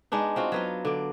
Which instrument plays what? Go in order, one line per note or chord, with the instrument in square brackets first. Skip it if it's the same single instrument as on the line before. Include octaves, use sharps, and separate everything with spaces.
[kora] G#3 B3 D4 D#4
C4 F4 F#4
F#3 B3 F4
D3 D5